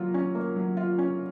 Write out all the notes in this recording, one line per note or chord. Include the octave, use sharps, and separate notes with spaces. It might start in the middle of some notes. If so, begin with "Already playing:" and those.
Already playing: F#3 A#3 F4
C#4
A#3
F#3
F4
C#4